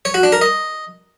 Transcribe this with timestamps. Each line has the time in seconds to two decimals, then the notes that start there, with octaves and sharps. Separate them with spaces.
0.05 C#5
0.14 F#4
0.23 D4
0.32 A#4
0.41 D#5